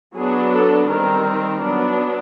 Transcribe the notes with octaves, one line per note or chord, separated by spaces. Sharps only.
F#3 B3 D4 G#4
A4
D#3 G3 C4 A#4
F#3 B3 D4